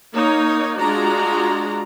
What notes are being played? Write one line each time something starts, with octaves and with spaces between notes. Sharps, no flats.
A#3 D#4 C#5
G#3 D4 F4 F#4 A#5